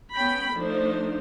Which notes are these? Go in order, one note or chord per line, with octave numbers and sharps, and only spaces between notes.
B3 C#4 G5 B5
F3 A3 D4 D#4 C5